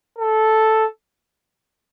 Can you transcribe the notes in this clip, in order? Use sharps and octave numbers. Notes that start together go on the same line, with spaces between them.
A4